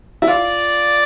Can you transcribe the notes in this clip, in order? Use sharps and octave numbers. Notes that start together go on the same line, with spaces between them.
E4
F4 D5